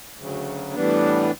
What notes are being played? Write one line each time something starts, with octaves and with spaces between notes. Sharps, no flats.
D2 C#3 F#3
A2 E3 G3 B3 D4